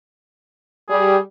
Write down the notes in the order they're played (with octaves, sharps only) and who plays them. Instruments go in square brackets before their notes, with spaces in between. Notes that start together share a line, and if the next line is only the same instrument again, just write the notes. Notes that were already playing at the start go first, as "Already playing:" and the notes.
[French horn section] G3 [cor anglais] G#4